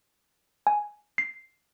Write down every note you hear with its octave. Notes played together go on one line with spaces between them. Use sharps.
G#5
C7